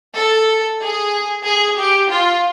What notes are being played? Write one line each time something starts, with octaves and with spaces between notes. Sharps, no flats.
A4
G#4
G#4
G4
F4